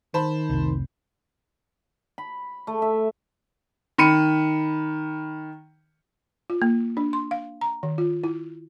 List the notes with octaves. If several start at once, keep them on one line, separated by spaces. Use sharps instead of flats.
D#3 C5 A5 B5
F1 C2
B5
A3
E5
D#3 B5 C#7 D#7
F4
A#3
D4
C6
F5
A#5
D#3
F4
E4